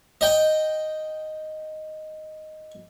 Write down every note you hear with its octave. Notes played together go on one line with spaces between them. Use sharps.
D#5 G5